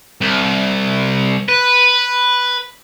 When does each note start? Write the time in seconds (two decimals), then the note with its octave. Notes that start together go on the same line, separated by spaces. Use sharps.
0.21 C2
1.49 B4